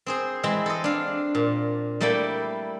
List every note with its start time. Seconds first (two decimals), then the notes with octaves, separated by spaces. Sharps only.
0.06 C4 G#4 C5
0.43 E3 G#3 C4 E4
0.66 A4 D#5
0.84 D4 F5
1.35 A#2
2.01 G3 A3 A#3 E4 D5 G5